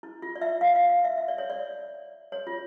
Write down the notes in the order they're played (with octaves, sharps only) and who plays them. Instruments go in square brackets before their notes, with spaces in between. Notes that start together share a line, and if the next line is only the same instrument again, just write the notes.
[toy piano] E4
F4
D5
E5
F5
F5
F5
E5
E5
D5
C#5
D5
C#5
F4